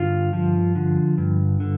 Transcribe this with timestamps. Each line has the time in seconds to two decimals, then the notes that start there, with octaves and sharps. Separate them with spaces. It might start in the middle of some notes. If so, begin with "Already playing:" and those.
Already playing: G2 D3 F4
0.33 F3
0.75 D3
1.18 G2
1.60 D3